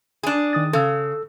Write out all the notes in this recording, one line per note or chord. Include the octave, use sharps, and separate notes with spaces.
D4 G#4
D#3 D#6 A6
C#3 A4 E6